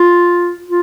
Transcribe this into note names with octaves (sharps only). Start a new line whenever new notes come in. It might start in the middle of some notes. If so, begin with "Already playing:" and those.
Already playing: F4
F4